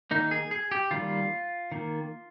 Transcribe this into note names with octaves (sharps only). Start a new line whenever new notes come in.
D#3 A#3 D#4
G#4
G#4
G4
D#3 G3 A#3 F4
D#3 A#3